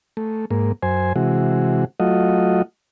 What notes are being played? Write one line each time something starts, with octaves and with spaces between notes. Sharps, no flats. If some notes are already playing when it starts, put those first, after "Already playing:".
A3
G#2 A#3
F#2 C5 G#5
C3 E3 G#3 F#4
F#3 A3 F4 F#4 D#5